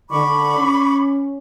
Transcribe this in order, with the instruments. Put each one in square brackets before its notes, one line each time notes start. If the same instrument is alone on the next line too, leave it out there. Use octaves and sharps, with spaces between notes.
[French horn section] D3 [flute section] B5 C#6 D6
[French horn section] C#4